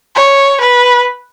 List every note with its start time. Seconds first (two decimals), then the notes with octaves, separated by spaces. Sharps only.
0.15 C#5
0.60 B4